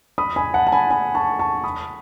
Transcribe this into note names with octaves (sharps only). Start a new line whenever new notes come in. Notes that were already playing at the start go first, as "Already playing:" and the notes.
B5 D#6
G#5 B5
F#5 A5
A5
G#5 B5
G#5 B5
A5 C#6
A5 C#6
B5 D#6